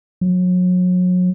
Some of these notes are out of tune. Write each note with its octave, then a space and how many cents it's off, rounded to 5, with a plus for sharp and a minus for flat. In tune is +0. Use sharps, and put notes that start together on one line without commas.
F#3 -35